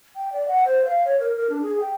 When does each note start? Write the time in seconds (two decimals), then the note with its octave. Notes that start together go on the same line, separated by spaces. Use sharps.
0.16 G5
0.33 D5
0.48 F#5
0.65 C5
0.85 F5
1.05 C#5
1.20 A#4
1.36 A#4
1.50 D4
1.62 G#4
1.80 G5